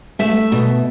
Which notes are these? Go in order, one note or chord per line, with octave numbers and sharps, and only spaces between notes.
A3 E5
B2